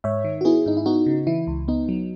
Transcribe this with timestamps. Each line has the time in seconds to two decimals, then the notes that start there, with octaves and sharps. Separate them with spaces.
0.04 G#2 C#5 E5
0.24 D#3
0.41 F#4
0.45 B3 E4 G#4
0.66 G#2 D#4
0.77 E4
0.86 B3 D#4 F#4
1.06 C#3
1.27 E3 E4
1.47 C#2
1.68 B3 D#4
1.89 F#3